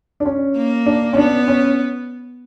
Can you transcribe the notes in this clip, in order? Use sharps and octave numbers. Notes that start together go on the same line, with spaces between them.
D4
C#4
A#3
D4
C#4
B3 D4
C#4